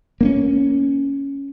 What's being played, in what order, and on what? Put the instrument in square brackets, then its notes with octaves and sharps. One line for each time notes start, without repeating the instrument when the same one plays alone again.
[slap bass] A#3 C4 C#4